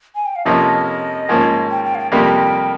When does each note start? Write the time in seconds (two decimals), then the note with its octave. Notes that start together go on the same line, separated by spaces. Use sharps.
0.15 G#5
0.26 G5
0.35 F5
0.45 F2 C3 F3 A#3 C#4 D#5
1.29 G#2 F3 A#3 C#4
1.71 G5
1.85 G5
1.95 F5
1.98 G5
2.12 F2 C3 G3 A#3 G5